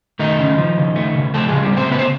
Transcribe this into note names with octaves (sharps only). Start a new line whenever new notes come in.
D#3 A3 D#4
C#3
F3
C#3
A3
C#3
F3 A3 A4
G#3 G#4
C#3
G3 G4
A3 C4 C5
C#3 B3 B4
C5